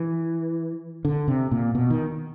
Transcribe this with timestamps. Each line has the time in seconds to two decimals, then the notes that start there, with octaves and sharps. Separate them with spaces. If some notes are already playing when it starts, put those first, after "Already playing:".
Already playing: E3
1.05 D3
1.28 C3
1.51 A#2
1.75 B2
1.90 D#3